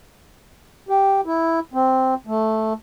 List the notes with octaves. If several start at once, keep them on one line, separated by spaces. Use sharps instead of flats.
G4
E4
C4
A3